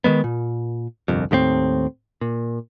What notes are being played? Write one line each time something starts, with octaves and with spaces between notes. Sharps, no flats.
D#3 F3 G#3 B3
A#2
G1 C2 F2
D#2 A2 A#3 C4
A#2